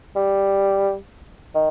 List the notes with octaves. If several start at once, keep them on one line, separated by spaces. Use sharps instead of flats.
G3
D#3